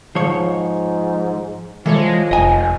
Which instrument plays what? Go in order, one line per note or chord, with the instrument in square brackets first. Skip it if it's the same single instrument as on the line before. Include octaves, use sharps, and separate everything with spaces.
[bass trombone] G#2 [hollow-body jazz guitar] F3 C#5
[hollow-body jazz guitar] E3 A4 C#5 [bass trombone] F3 [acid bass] G#3
[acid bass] F1 [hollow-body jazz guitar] D#5 G#5